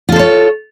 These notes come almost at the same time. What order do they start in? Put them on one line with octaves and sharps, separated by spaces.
F4 A4 C5 C#5